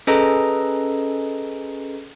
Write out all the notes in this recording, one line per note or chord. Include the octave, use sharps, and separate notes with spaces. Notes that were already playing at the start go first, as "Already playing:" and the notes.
C#4 G#4 A4 B4 D#5 A#5